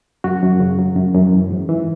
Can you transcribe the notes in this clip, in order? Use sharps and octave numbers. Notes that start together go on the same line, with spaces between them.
F#2 F#4
F#2
C#3
F#3
F#2
F#2
E3
G#2
E3